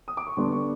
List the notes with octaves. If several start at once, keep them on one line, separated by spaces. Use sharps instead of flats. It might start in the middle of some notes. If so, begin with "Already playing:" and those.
D#6
D6
C#6
D3 G3 B3 D4 C6
C#6